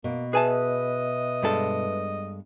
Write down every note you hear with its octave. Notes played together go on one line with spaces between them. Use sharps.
B2 A#3
G#4 B4 D#5 E5 G#5 A5
G2 G#3 A4